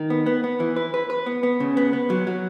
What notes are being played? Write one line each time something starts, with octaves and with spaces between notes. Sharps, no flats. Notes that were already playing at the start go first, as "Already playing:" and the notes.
Already playing: D#3
B3
B3
B3
E3
B4
B4
B4
B3
B3
C#3
B3
B3
F#3
F#3